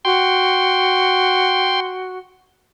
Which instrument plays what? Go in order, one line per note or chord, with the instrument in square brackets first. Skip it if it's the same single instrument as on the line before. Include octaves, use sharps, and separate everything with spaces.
[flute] F#4 [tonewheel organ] G5 C6